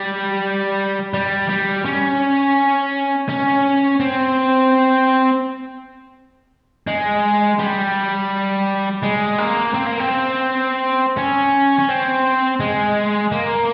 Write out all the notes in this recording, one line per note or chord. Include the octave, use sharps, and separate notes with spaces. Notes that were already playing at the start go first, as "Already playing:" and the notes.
Already playing: G3
G3
G3
C#4
C#4
C4
G#3
G3
G#3
A#3
C4
A#3
C4
C#4
C#4
C4
G#3
A#3